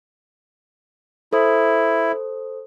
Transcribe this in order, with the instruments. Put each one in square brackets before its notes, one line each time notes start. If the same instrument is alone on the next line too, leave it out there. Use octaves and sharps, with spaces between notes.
[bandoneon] E4 [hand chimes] A4 C5 D#6